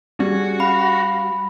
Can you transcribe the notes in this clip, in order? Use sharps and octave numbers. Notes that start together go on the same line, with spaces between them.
G3 C#4 F#4 G#4
F5 B5